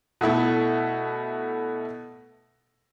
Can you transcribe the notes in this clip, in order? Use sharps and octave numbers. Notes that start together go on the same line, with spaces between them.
B2 A3 E4 A4